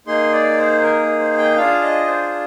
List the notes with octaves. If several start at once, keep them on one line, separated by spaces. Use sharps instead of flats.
A#3 D#4 G#4 C6
D5
C5
A#4
C5
G5
D4 F4 G#4 F5
D#5
C5